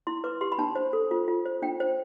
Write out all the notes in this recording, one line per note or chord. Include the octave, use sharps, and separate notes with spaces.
E4 C6
B4 D6
G4 C6
B5
D4 A5
C5
A4
F4
F4
C5
D4 G5
C5